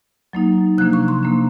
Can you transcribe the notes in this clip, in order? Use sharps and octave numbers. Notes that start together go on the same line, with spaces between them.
F#3 A#3 D#4
C3 F3 A#3 D4 F#6
C#6
C6
C3 F3 A#3 D4